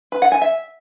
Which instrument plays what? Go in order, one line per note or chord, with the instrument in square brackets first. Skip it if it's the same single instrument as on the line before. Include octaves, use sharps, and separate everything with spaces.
[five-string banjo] B4
F#5
G#5
E5